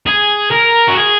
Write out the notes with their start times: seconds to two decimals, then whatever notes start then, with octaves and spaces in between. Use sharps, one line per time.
0.07 G#4
0.52 A#4
0.88 F#4
0.96 G#4